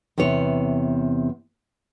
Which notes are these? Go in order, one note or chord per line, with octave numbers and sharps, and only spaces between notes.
E2 C3 B3 C#5